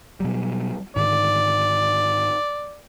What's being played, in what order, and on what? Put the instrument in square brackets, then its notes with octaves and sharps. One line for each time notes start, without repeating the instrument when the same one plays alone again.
[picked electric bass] B2 F#3 G3
[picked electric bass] G#2 D3 D#3 [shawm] D5